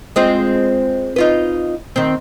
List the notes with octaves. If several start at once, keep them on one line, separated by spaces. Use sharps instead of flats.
G#3 C4 F4
D#4 F4 B4
D#3 C4